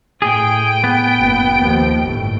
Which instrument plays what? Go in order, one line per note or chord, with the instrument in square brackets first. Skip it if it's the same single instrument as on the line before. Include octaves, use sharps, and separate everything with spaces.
[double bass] A2 [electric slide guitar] G#4 [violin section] G5 D7
[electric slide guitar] B3
[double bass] F#1
D#2 F3
G1 A2